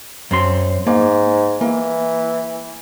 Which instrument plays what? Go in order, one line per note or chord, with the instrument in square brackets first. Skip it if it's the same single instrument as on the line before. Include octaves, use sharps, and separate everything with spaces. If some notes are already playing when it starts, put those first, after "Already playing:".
[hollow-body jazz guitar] F#2 C4 C6
[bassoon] G#2 [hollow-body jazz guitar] A#3
[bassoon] E3 [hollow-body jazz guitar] A#3